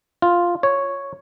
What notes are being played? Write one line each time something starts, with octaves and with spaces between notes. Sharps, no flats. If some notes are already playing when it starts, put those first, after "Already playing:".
F4
C#5